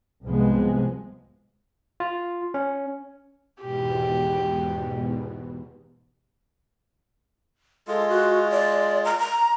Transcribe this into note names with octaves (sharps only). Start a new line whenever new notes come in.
C2 G#2 C3 F3 G#3 B3
F4
C#4
E2 G#2 B2 G4
G#3 F4 A4
F#4
D5
A#5
A#5